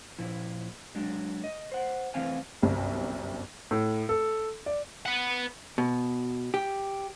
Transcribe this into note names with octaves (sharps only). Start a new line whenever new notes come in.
A#2 F3 E4
F#3 G#3 D4
D#5
C5 F#5
E3 A3 C4 F5 G#5
G1 C2 F#2 C3
A2
A4
D5
B4 F#5
B2
G4